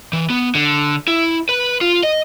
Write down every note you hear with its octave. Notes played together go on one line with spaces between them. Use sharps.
E3
B3
D3
E4
B4
F4
D#5